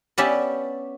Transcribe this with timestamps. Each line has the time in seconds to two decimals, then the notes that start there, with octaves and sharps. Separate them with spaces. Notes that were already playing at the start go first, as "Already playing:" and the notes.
0.18 B3 C#4 G4 D5 E5